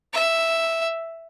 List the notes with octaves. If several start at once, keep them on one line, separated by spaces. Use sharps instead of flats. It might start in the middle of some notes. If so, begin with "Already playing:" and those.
E5